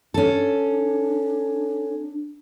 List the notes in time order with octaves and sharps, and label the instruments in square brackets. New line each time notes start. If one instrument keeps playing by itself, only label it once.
[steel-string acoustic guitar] C#4 A4 [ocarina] D4